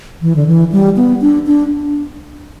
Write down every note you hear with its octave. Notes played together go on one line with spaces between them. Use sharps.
E3
D3
E3
G3
B3
D4
D4